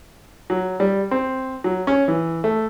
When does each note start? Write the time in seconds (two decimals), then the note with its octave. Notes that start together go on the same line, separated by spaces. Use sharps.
0.50 F#3
0.80 G3
1.11 C4
1.64 F#3
1.87 C#4
2.08 E3
2.44 A3